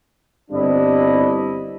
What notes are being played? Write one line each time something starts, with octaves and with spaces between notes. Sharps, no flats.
G1 G3 C4 D4 E4 D#5